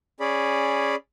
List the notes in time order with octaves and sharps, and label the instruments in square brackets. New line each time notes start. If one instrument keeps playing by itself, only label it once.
[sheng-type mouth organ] C#4 G#4 D5 B5